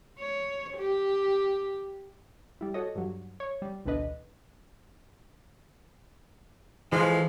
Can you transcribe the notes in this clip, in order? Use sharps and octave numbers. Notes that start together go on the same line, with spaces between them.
C#5
G4
G3 E4
F#4 A4 C#5 D#5
G2 F#3
C#5
G3
A1 D2 B2 D4 B4 D#5
A2 E3 F3 G#3